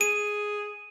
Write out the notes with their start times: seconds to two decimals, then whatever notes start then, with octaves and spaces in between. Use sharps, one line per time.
0.01 G#4 D#7